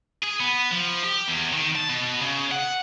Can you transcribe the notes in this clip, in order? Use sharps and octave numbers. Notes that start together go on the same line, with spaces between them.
G#4
B3
F3
G4
E2
D#3
A5
B2
C#3
F#5